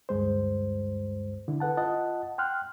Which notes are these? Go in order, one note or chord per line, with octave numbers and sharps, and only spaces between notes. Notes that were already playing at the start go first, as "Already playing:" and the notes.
D2 G2 G#3 C5
D3 E4
A4 B4 F#5 A5
F4 D#5 F#5 A5
G5 C6 F6 F#6